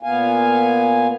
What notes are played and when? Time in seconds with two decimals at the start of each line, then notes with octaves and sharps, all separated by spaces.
0.02 A#2 B3 F5 G#5